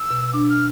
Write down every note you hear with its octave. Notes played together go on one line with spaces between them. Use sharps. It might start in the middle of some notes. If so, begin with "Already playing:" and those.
Already playing: E6
B2
D4 D6
F6